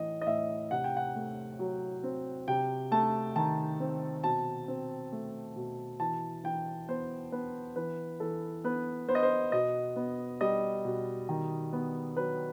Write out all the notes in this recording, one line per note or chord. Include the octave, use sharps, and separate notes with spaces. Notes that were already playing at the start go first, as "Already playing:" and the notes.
Already playing: A2 E3 A3 D#5
D#5
A2 E5
C3 F#5
G5
F#5
A3
F#3
C4
C3 G5
A3 A5
D#3 A5
C4
B2 A5
C4
A3
B2
E3 A5
E3 G5
B3 C5
B3 B4
E3 B4
E3 A4
B3 B4
B3 C5
D#5
C5
B2 D#5
B3
G3 D#5
B2
D#3
B3
F#3 B4